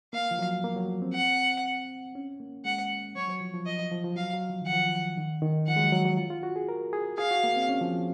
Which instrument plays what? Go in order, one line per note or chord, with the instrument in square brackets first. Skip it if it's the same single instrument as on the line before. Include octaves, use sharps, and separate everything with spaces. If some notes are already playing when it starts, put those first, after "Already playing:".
[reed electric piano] A#3 [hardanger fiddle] F5
[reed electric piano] F3
F#3
A#3
F#3
F3
C4
[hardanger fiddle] F#5
[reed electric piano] C#4
A#3
[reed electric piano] G#3 [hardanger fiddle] F#5
[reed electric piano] F#3 [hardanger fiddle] C#5
[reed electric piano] F#3
F3
F3
[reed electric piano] F3 [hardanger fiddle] D#5
[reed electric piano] F3
F3
F3
[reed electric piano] F#3 [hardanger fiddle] F5
[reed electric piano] F#3
F3
[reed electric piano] D#3 [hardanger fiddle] F#5
[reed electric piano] F3
D#3
D#3
[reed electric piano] F3 [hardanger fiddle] F#5
[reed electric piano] G#3
F#3
F#3
F#3
F4
F4
F#4
G#4
A#4
G#4
[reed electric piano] G#4 [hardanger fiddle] F5
[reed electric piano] F#4
A#3
C4
C#4
F3